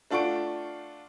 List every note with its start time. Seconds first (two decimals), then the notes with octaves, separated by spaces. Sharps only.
0.11 A3 D4 F4 F#5 C#6 D7